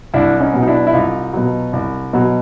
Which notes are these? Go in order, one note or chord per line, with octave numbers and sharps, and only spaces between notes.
C2 D4 E4
C#4 D#4
B2 F#3
D#4
D4 E4
E4
C2 D#4 F4
B2 F#3
C2
B2 F#3